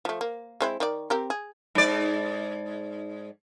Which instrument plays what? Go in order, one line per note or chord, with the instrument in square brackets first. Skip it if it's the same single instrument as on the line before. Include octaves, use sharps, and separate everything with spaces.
[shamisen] F3 A3
A#3
G#3 C4 E4
D#3 D5
C4 G4 A#4
G#4
[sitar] G#2 D5